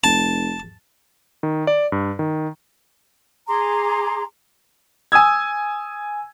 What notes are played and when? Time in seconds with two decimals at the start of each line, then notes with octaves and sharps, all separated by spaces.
0.04 F1 A5
1.43 D#3
1.67 D5
1.92 G2
2.19 D#3
3.48 G#4 A#5 C6 D6
5.12 G#5 D#6 E6 G#6